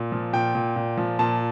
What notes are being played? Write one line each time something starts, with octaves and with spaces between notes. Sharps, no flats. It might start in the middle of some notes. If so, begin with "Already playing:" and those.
Already playing: A#2
F3
A#2 G5
A#2
A#2
F3
A#2 A5